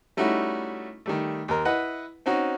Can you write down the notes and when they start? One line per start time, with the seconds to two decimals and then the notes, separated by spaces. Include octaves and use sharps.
0.17 G3 A3 C#4 D#4 E4 F#4
1.06 D#3 G3 A3
1.48 D#2 A#4
1.65 E4 B4 D#5 F#5
2.26 C4 C#4 D#4 F#4